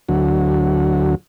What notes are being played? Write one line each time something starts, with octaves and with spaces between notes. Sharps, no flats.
D2 F#3